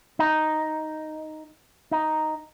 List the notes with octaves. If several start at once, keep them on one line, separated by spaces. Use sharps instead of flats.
D#4
D#4